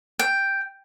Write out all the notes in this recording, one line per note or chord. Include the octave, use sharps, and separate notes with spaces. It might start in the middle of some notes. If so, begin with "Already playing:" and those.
G5